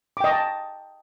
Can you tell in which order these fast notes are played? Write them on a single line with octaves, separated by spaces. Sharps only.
D6 G5 D#5 C#6 A5